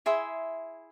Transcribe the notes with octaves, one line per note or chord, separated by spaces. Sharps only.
E4 G#4 E5 C6